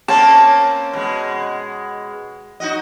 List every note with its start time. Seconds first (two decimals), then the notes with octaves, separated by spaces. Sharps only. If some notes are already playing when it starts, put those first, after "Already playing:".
0.08 A#3 C4 C#4 A5
0.93 B2 G#3
2.60 D#4 F#4 D#5